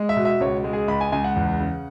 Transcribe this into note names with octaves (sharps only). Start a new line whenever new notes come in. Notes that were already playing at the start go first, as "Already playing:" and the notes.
Already playing: G#3
E5
B2
E5
C#2 C#5
G#3
G#4
C#2 B5
G#5
C#2 G#5
F#5
E2
C#3